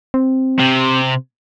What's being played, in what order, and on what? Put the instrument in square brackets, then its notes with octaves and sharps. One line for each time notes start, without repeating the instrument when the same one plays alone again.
[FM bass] C4
[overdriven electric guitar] C3